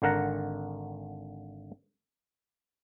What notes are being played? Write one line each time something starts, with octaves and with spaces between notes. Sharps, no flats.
G#1 D3 A#4 F#5 A#5